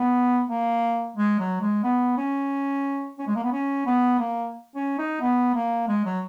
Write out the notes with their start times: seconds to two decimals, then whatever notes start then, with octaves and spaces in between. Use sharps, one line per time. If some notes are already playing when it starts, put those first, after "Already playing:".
Already playing: B3
0.48 A#3
1.16 G#3
1.39 F#3
1.61 G#3
1.84 B3
2.17 C#4
3.18 C#4
3.27 G#3
3.36 A#3
3.43 B3
3.52 C#4
3.86 B3
4.19 A#3
4.75 C#4
4.98 D#4
5.20 B3
5.54 A#3
5.88 G#3
6.05 F#3